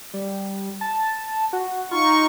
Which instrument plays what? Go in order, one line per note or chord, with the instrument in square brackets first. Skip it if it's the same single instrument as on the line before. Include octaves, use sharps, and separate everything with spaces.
[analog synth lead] G3
A5
F#4
[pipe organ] D#4 C#6 [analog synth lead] F4